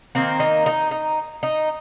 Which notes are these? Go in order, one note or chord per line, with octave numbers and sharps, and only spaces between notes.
D#3 A#3 C4
D#4
D#4
D#4
D#4